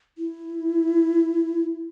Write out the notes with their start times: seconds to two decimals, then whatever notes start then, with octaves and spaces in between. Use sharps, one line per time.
0.18 E4